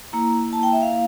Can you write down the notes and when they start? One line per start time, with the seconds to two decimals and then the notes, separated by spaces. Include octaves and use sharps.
0.13 A#3 E4 A#5
0.53 A5
0.63 G5
0.73 E5
0.82 F5